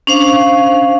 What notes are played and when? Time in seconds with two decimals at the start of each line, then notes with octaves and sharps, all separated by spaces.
0.07 C#4 D4 C5 F5